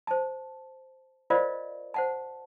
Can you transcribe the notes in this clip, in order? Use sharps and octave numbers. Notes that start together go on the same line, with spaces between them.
C5 A5
F4 A#4 C5 D5 D#5 F5
C5 F#5 A5